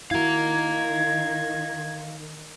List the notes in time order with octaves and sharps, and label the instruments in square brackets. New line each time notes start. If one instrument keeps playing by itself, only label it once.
[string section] D#3 [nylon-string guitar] E4 F#4 [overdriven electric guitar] F5 A#5 [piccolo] G#6